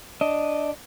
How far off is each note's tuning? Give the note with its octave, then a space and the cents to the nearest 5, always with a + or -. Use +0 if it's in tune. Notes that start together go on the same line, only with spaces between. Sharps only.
D4 +0 D#5 +0